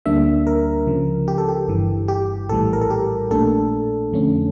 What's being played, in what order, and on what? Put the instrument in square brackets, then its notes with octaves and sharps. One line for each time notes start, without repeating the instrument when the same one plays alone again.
[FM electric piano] D2 D3 G3 A#3 D4 E5
A#4
C#2 C#3 F3
G4
A4
G4
G1 G2 E3
G4
A#1 A2 E3 G3 A4
A#4
A4
G4
A#1 A#2 A3 D4 A4
F2 D3 A3 C#4